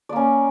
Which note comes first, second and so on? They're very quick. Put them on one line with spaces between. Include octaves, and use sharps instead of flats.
D5 A#3 C#4